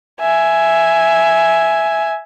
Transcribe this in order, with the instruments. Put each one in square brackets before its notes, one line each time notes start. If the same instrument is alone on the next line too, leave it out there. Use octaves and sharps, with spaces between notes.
[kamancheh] E5 G#5